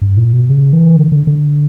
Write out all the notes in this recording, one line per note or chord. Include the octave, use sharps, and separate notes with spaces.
G2
A#2
B2
C#3
E3
D3
D3
D3